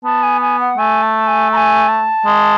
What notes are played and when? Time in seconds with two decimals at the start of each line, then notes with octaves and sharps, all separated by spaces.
0.04 B3 A5
0.23 G#5
0.41 G#5
0.60 F#5
0.78 A3 G#5
1.02 A5
1.27 G#5
1.52 A#5
1.56 G#5
1.88 A5
2.26 G#3